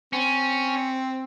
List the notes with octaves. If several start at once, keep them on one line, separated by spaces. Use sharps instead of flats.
C4 C#4